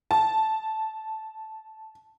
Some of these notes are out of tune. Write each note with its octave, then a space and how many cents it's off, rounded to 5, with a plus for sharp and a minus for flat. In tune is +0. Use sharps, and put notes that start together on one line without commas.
A5 -5